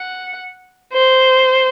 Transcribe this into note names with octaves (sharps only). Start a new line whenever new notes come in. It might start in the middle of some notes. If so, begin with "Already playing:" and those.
Already playing: F#5
C5